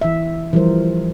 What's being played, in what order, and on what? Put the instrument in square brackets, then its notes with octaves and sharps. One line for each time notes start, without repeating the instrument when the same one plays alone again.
[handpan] E3 E5
E3 F3 G3 A#4 C5